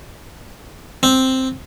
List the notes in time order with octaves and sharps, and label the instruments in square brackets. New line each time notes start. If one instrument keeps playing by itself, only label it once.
[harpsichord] C4